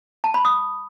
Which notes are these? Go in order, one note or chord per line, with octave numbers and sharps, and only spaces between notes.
A5
B5
D#6